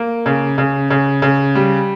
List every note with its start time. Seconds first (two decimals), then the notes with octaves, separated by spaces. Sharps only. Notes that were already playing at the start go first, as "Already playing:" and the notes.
Already playing: A#3
0.26 C#3
0.58 C#3
0.90 C#3
1.22 C#3
1.55 G3